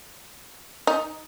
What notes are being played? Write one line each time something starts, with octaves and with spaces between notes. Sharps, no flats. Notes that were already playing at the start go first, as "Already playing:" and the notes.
D#4